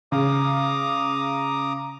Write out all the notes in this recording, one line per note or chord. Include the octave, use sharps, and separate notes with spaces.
C#3 A#5 D6 D#6